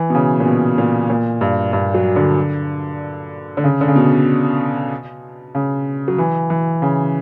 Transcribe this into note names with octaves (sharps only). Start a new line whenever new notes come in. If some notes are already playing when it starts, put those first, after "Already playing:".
Already playing: E3
B2
C#3
A#2
B2
A#2
A#2
G2
G2
F#3
D3
D3
C#3
D3
C#3
B2
C#3
F#3
E3
E3
C#3